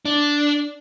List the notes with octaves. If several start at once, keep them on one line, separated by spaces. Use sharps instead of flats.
D4